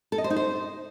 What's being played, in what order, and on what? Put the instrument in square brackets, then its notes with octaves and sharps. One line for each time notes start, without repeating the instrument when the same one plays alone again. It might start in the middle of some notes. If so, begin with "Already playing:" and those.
[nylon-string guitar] A4
D#5
C5
D#4
C5